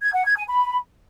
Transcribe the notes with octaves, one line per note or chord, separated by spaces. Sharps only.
G#6
F#5
G#6
G#5
B5